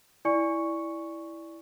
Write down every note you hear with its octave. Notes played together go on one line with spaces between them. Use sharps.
E4 D5 G#5 C#6 C#7